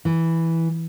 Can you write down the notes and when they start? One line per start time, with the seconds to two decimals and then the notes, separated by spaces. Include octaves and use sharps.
0.05 E3